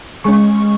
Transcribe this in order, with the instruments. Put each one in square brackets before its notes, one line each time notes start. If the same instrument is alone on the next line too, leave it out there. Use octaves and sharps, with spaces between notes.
[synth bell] G#3 C#4 C#6